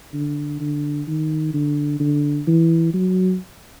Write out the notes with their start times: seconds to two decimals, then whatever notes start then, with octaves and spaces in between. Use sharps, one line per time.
0.14 D3
0.60 D3
1.07 D#3
1.54 D3
2.00 D3
2.47 E3
2.94 F#3